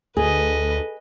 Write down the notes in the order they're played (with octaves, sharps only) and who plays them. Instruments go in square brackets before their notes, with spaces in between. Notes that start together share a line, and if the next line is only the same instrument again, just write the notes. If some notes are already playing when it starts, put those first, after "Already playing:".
[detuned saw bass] D2 [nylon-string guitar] G#4 [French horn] A4 [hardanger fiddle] B4 D#5